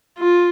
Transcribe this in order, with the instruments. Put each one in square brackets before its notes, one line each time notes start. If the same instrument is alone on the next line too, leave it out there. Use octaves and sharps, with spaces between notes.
[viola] F4